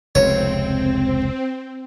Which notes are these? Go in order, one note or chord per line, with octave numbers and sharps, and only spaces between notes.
F1 C#2 C4 C#5